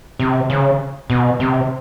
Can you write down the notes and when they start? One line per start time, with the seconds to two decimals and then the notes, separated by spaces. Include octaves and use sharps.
0.19 C3
0.50 C#3
1.10 B2
1.40 C3